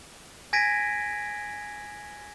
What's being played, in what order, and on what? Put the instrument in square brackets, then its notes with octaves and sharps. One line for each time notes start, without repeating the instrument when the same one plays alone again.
[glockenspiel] G#5 G#6 A#6 B6 D7 D#7